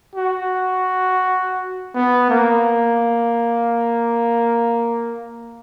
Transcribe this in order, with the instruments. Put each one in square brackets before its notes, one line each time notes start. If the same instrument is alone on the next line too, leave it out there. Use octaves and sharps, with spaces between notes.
[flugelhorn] F#4
B3
A#3